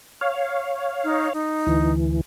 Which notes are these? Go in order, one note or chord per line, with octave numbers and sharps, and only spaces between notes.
C#5 F5
D#4
D#4
D2 E3